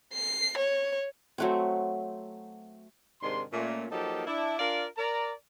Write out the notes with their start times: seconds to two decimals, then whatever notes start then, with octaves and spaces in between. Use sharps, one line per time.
0.13 C7
0.58 C#5
1.38 F#3 A3 C4
3.22 G#2 C3 D#3 D4 C6
3.52 A#2 A3 C#4
3.91 F3 F#3 A#3 D#4 G4 A4
4.27 D4 E4 A5
4.59 D4 F4 A#4 D5 F5
4.98 A#4 D5 A#5